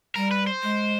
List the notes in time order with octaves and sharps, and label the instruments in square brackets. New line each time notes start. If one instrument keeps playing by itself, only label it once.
[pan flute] G3 [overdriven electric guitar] A#4
[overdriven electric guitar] B4
C5
[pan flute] G#3